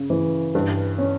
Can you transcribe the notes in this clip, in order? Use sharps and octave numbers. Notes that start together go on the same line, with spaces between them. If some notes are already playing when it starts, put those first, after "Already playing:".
Already playing: C#3
E3
G2
C#4